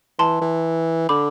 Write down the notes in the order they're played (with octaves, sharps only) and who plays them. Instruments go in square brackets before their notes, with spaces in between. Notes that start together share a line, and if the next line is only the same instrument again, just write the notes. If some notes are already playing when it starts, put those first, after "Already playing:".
[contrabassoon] E3 [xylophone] A5 C6
[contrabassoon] E3
[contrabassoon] D3 [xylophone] B5 D6